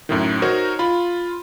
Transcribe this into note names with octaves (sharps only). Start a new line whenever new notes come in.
F#2 A2 D#3
D#4 F#4 A#4 C5 C#5 D#5
F4 B5